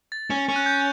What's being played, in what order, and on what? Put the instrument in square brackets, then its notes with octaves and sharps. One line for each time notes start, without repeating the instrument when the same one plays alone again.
[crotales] A6
[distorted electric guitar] C#4
C#4
[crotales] F#6
G6